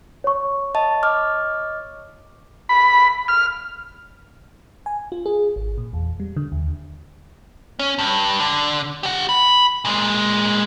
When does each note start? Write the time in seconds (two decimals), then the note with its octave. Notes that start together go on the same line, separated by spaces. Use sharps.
0.24 C#5 C#6
0.75 D#5 A5
1.03 D#5 D6 F6
2.69 B5
3.28 F6
4.86 G#5
5.12 F4
5.26 G#4
5.56 G#1
5.78 A#2
5.93 E2
6.20 G3
6.37 D3
6.52 D#2
7.79 C#4
7.98 G2
8.40 D3
9.03 G4 F#5
9.29 B5
9.85 A#2 G#3